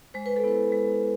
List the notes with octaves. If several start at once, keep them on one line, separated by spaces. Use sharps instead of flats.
G#3 C5
B4
A4
B3 E4 B4
G#3